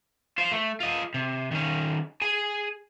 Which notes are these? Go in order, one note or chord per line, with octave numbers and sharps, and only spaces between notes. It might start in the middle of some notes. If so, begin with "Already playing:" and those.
F4 C5
A3
F4 D#5
C3
D#3 C#4
G#4 G#5